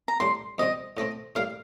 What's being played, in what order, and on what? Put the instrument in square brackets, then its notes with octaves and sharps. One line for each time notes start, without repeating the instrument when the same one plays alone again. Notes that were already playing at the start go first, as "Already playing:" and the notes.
[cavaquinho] A#5
[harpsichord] A2 G3 D4 [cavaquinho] C6
[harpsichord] F2 C3 G3 C4 [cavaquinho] D#5
[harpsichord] A2 A3 C4 [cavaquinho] D#5
[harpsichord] A2 G3 A#3 [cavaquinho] F5